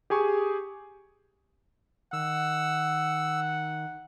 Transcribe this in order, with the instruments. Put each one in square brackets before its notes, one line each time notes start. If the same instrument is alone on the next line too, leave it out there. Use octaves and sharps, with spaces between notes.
[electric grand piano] G4 G#4 G#5 C#6
[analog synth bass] D#3 [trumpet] F#5 [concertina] E6